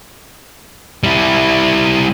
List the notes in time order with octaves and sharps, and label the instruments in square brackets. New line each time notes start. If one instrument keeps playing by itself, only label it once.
[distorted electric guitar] G3 E4